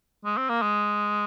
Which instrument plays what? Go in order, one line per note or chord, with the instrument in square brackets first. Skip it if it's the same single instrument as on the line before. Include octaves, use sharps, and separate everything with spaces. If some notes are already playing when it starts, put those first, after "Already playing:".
[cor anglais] G#3
C4
A#3
G#3